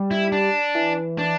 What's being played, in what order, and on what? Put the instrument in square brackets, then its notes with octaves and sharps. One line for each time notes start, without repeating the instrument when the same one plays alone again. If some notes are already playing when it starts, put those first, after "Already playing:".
Already playing: [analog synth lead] G3
[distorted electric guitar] E4
D4
[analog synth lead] E3
[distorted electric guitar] D4